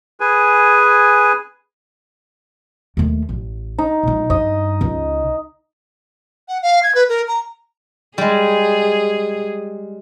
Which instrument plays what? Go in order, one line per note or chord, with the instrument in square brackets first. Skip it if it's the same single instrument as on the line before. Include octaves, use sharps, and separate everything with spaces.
[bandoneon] G#4 B4 G#5
[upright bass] D#2 A3
A1
[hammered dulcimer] D#4
[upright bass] A#2 G#3
[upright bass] G2 [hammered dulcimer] D#5
[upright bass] C#2
[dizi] F#5
F5
G#6
B4
A#4
A#5
[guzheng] G3 G#3 [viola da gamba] G#4